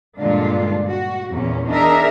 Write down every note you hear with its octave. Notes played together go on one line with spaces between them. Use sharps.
G2 A#2 D3 G#3 D4 F4
F#4
E2 A#2 C#4
D4 D#4 G#4 A#4 E5